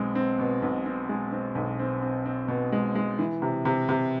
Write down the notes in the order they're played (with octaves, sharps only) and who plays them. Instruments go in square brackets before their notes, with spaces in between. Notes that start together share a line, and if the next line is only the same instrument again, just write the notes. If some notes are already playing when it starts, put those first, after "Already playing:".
Already playing: [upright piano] B1 G#3 C4
C4
B2
B1
C4
G#3
C4
B1
C4
C4
C4
B2
G#3
G#3
E3
C3
C3
C3